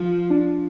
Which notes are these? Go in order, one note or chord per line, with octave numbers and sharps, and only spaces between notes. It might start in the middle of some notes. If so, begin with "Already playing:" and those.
Already playing: F3
D4